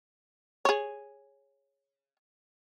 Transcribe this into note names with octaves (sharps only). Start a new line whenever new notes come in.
G#4 C#5